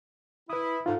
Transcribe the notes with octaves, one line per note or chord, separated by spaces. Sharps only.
E4 B4 D#6
G#2 F4 A4